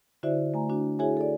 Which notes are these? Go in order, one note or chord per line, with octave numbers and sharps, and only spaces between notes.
D3 E4 F#4 C5 D5 E5
A3 G#5 A#5
D4 F#4
E4 F#4 G#4 C#5 E5 G#5
A4 D5